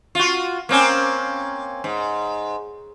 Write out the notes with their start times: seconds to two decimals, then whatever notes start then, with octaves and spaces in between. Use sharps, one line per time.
0.15 F4 F#4
0.69 A#3 C4 C#4
1.84 G#2